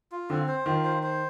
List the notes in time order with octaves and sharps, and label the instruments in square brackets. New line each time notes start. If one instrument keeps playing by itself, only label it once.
[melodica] F4
[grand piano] D3 [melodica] C4
[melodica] C5
[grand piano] D#3 [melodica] F4
[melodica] C5
C5